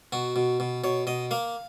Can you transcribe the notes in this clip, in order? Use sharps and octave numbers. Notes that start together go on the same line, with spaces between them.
B2 F#4
B2
B2
B2 C#5
B2 D#5
A#3 F5